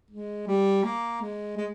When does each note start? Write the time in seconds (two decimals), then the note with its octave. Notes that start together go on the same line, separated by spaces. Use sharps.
0.10 G#3
0.47 G3
0.84 A#3
1.21 G#3
1.57 G#3